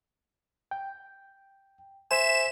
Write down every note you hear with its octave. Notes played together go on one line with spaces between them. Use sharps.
G5
C5 E5 G#5 E7